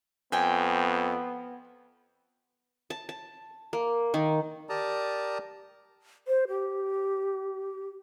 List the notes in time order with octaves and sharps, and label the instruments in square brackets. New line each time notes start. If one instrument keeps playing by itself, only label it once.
[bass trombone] F2 [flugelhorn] B3 [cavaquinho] G5 G#5
[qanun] A5
A5
A#3
D#3
[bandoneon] G4 A#4 D5 A5 A#5 D#6
[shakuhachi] C5
G4